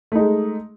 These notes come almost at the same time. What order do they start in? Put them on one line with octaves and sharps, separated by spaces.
A3 D#4 G#3